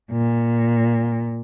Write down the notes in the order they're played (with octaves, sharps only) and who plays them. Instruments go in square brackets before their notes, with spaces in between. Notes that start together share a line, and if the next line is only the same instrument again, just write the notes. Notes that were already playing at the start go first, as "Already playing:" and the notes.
[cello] A#2